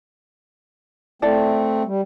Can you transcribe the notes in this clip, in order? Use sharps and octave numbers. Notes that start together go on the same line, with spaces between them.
A3 C4 E4 A4 D5
G3